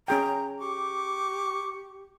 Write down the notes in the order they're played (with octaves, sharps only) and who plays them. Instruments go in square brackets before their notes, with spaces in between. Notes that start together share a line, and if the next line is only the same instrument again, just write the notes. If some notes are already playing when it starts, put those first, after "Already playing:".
[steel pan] C#4 G#4 G5 [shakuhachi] A#5
[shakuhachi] G4 [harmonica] C#6 D6